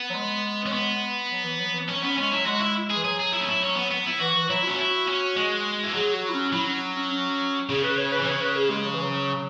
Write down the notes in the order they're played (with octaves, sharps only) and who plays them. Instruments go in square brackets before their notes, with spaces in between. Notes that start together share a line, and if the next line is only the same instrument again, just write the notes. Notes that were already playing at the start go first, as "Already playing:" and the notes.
Already playing: [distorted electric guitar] B3
[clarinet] F#3
G#3
[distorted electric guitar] C#4
B3
[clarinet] F#3
E3
F#3
E3
[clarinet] F#3 [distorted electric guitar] C#4
[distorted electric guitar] B3 [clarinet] C#4
[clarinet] G#3 [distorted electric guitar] C#4
[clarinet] F#3 [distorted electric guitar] E4
[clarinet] G#3 [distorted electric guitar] F#4
[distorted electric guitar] E4
G#4
[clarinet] E3
[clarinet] F#3 [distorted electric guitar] G#4
[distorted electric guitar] G#4
E4
C#4
E4
C#4
B3
B3
E4
[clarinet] E3 [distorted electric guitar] F#4
[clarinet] E3
[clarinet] F#3 [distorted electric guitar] E4
[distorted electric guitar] C#4 [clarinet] F#4
[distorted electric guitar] E4
C#4
G#3
E3
[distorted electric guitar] F#3 [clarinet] G#4
[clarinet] F#4
E4
C#4
[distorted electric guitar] F#3 [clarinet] E4
[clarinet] C#4
C#4
C#4
[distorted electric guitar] C#3 [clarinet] G#4
[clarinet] B4
C#5
B4
[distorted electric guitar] E3
[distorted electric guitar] C#3 [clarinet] C#5
[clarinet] B4
G#4
G#3
F#3
E3
F#3